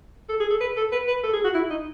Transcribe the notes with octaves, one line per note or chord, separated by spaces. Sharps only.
A4
G#4
A4
B4
A4
B4
B4
A4
G#4
F#4
E4
D#4